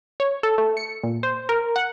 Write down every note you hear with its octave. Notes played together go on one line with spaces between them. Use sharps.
C#5
A4
A3
C#7
A#2
C5
A#4
F#5